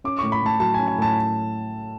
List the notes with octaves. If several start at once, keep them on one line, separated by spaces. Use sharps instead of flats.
C#4 D6
A2 C#6
B5
A2 A5
F#3 A5
G#5
C#4
G#5
A2 A5